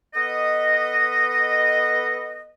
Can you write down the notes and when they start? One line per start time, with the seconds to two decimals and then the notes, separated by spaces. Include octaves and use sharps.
0.15 B3 A4 B4 D#5